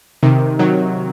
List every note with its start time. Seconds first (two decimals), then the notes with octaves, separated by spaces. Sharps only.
0.23 C3 D#3
0.59 D#3 F#3